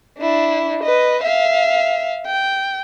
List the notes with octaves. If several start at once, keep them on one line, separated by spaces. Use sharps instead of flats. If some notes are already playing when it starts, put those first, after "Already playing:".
D4 E4
B4 D#5
E5 F5
G5